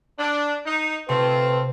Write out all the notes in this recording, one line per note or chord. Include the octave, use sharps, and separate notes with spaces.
D4
D#4
C3 A3 C4 F4 B4